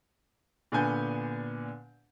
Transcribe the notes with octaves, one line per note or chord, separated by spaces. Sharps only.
A#2 D3 B3 D4 G#5 G6